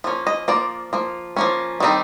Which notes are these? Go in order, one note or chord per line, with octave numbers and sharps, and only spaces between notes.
F3 A#3 C#4
D#5
F3 A#3 D5
F3 A#3
F3 A#3 C#4
D#3 G3 C4 D#4